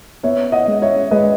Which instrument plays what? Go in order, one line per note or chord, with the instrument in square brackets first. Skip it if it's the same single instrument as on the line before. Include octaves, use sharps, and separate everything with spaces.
[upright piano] B3 C#5 E5
D#5 F#5
G#3
C#5 E5
G#3 B4 D#5